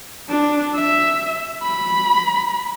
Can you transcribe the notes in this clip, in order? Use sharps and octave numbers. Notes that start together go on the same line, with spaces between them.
D4
E5
B5